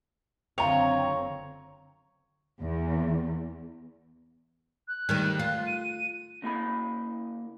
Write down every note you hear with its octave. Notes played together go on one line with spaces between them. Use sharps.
F#1 D3 C4 F4 C#5 G5 A#5
E2
F#6
D2 D#3 G3
F4
D#7
C#3 A#3 E4 B5